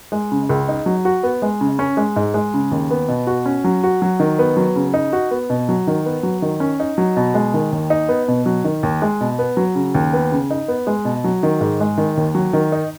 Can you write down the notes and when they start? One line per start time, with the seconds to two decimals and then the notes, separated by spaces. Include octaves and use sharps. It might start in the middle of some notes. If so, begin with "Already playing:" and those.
0.12 G#3
0.32 C#3
0.49 C#2
0.69 D#4
0.86 F#3
1.05 F#4
1.23 B3
1.42 G#3
1.61 C#3
1.79 C#4
1.97 G#3
2.16 G#2
2.34 G#3
2.54 C#3
2.71 D#2
2.91 B3
3.08 B2
3.27 F#4
3.46 C#4
3.64 F#3
3.84 F#4
4.02 F#3
4.20 D#3
4.39 B3
4.57 F#3
4.76 C#3
4.94 D#4
5.13 F#4
5.31 B3
5.50 B2
5.69 F#3
5.87 D#3
6.06 B3
6.23 F#3
6.42 D#3
6.60 C#4
6.80 D#4
6.98 F#3
7.17 B2
7.34 G#3
7.54 D#3
7.72 D#2
7.90 D#4
8.09 B3
8.28 B2
8.46 F#3
8.64 D#3
8.83 D#2
9.02 G#3
9.21 B2
9.39 B3
9.57 F#3
9.75 C#3
9.95 D#2
10.13 B3
10.32 C#3
10.51 D#4
10.68 B3
10.87 G#3
11.05 B2
11.24 F#3
11.43 D#3
11.61 G#2
11.80 G#3
11.98 D#3
12.17 D#2
12.35 F#3
12.53 D#3
12.72 D#4